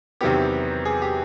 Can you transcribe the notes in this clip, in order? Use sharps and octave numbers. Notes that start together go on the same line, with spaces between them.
E2 C3 D#3 F#3 B3 G4
G#4
G4